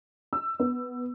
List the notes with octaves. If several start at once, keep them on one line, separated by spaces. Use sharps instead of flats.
E6
B3